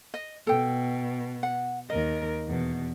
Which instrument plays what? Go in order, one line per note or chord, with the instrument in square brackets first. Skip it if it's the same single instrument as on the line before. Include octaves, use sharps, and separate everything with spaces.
[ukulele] D#5
[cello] B2 [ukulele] A4 G5
[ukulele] F#5
[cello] D#2 A#4 [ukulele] D#5
[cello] E2 B2